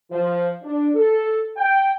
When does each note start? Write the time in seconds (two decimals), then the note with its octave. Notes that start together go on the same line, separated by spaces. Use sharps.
0.11 F3
0.62 D4
0.95 A4
1.57 G5